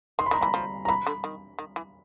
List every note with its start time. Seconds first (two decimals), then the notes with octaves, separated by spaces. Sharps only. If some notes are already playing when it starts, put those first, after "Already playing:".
0.19 D#3 C6
0.26 B5
0.31 D#3 A#5
0.41 E3 B5
0.54 F3
0.85 A#5
0.88 E3 B5
1.07 D3
1.24 D#3
1.59 D#3
1.76 E3